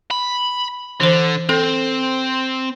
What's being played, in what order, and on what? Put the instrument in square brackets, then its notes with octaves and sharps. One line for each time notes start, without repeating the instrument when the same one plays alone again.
[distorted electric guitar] B5
[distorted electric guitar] D3 [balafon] E3 C5
[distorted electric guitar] C4 [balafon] A4